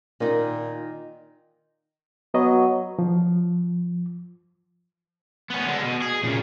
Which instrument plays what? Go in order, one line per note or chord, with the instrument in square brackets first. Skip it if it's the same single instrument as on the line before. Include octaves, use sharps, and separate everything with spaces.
[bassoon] A#2 [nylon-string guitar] D#3 D#4
[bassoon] F#3 [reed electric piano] B3 D#5
[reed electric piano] F3
[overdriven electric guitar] B3 C#4
D3 G#3
B2
G#4
A#2 C#3